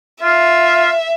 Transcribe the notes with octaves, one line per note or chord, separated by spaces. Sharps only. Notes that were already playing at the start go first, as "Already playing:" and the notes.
F4 E5